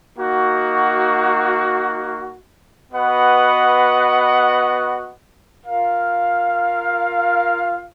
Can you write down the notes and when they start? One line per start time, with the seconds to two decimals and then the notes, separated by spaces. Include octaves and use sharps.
0.16 A#3 D#4 F#4
2.91 B3 F#4 B4 D#5 F#5
5.65 F4 A#4 F5